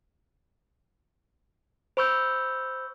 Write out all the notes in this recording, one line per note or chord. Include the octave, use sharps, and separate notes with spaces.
C5 B5 C#6 E6 G6